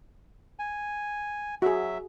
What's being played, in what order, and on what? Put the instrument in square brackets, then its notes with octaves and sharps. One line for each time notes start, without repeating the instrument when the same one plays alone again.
[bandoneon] G#5
[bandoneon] F#3 E5 [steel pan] F#4 G#4